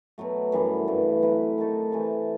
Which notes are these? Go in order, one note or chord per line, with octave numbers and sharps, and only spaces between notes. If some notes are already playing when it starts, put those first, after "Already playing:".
B2 F#3 A3
F#2 E3 G3 B3
G2 E3 A3
F#3 C4 E4 B4
D#3 A3 D#4 A4
C3 E3 A3